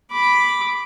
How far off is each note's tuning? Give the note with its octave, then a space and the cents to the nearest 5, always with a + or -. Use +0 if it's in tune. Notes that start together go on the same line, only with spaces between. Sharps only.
B5 +0 D6 +0